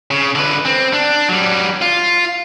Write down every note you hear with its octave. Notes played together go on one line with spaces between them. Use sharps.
C#3
D3 B4
C4
D4
F#3 G3
F4